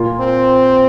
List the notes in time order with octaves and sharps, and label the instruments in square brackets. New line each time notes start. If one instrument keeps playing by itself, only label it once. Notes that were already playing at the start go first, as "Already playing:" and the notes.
Already playing: [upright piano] A#2 A#3 F4
[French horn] C4